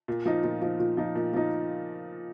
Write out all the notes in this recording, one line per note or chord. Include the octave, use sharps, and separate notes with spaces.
A#2
F3 D#4
A#2
F3 D#4
A#2
F3 D#4
A#2
F3 D#4